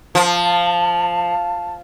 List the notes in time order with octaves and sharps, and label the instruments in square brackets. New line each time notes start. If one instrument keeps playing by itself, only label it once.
[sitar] F3 [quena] A5